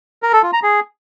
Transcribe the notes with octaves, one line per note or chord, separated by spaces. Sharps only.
A#4
A4
F4
A#5
G#4